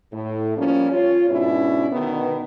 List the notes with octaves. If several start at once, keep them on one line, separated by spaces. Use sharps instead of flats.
A2
F3 G3 A#3 C#4
F4 C#5
G#2 B2 C#4 D4 E4
B2 D3 D#3 B3